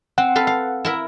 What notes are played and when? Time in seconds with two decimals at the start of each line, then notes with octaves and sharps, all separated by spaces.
0.18 C4 F#5
0.36 A4 B4 F5
0.47 F5
0.85 E4 A#4 E5